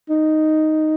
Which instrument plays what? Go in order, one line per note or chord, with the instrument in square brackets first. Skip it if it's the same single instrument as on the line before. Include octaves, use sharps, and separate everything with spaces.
[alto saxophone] D#4